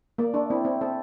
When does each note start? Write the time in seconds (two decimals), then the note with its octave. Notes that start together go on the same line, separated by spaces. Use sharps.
0.18 A#3 D5
0.34 A3 D4
0.50 C4 E4
0.65 C4 E4
0.81 C4 A4